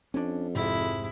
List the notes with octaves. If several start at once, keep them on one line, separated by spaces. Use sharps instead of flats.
F2 C#4 D4
F1 G#2 C3 G#3 E4